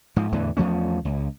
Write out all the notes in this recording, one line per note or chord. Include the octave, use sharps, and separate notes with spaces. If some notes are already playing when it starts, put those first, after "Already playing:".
G#2 F3
E2 A2 D3 E3
E2 F3 A3 C#4
C#2